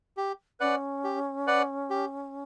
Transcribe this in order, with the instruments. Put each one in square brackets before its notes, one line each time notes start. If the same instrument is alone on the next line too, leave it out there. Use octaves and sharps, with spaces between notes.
[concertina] G4
[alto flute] C#4 [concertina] B4 D5 F#5
[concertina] G4
B4 D5 F#5
G4